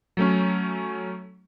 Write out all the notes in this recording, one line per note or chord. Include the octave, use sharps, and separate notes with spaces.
F#3 A3 C#4